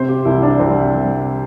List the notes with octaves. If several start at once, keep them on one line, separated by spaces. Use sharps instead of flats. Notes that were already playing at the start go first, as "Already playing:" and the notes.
Already playing: C3 C5
G4
C2 E4
D4
C2 C4
C2